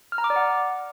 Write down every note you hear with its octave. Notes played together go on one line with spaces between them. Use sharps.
F6
A#5
D6
D5
F#5